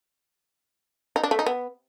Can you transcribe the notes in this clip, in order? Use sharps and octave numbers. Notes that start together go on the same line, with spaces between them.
D#4
D4
A3
D#4
B3